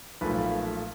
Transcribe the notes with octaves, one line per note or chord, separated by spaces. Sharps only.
B1 A#2 F3 A3 B4